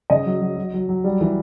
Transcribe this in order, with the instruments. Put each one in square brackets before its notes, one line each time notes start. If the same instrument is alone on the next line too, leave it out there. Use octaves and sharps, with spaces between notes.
[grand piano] C#3 D#5
F#3
F#3
F#3
F#3
F#3
G3
E3